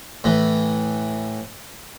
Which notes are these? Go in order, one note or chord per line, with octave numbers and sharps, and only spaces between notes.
A2 E3